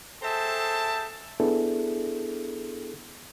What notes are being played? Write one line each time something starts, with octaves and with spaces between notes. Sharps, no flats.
G#4 A4 C5 E5 G5 A5
B3 D4 E4 G#4 A4